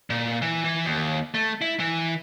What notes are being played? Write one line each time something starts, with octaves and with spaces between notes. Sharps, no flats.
A#2
E3
E3
D#2
A3
E4
E3